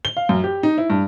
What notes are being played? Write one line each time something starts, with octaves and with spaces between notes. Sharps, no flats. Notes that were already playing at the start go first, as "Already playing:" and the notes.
G7
F5
F#2
G4
D#4
E4
G2